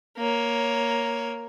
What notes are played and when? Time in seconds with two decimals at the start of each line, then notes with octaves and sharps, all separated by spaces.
0.18 A#3 C#5